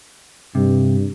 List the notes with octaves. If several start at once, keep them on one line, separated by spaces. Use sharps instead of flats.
G2 C3